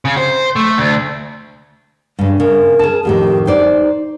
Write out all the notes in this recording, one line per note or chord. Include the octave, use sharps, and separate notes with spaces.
C#3
C5
A3
D2
G2 C#3
C#3 A#4
G#4 A5
F2 A2 D#3 G4
D#4 C5 D5